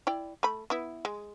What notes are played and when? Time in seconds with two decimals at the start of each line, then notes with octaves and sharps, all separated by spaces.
0.07 E4 D5 G5
0.43 A3 B5
0.70 B3 E4
1.05 G#3